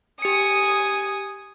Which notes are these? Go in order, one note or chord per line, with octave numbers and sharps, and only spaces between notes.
G4 G#5 D#6 C#7